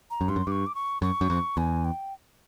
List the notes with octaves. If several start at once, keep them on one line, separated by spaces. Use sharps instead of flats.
A#5
F#2
G2 C6
F#2
G2 C#6 D6
D6
C#6
F#2 C#6
F#2
F2
E2 G#5
G5